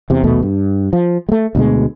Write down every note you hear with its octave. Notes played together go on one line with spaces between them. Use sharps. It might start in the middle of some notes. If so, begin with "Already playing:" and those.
E2 C3
A#1 D#2 B2 A3
G2
F3
G#3 A3
D2 B2 G#3